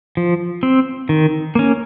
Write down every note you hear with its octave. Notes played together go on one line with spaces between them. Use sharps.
F3
C4
D#3
A#3 C#4